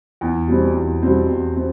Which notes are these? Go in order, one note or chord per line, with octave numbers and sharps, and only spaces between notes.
E2
B2 G3 C4
E2
B2 G3 C4
E2
C4